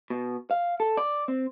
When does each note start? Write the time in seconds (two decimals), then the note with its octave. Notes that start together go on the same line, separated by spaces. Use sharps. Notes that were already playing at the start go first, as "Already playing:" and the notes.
0.10 B2
0.51 F5
0.80 A4
0.97 D5
1.28 C4